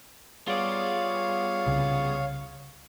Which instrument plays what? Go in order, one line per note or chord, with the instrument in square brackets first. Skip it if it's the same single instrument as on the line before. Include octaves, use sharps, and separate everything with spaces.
[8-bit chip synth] G3 B3 G#4 [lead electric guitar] F4 D5 [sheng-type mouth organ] C#5 F5
[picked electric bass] C2 C#3